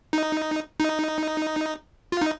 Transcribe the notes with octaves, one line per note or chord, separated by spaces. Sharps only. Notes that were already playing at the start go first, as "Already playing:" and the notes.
D#4
D#4
F4
D#4